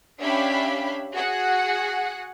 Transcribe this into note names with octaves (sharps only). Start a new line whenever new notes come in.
C#4 D4 G4 E5 F5 B5
F#4 G#4 F#5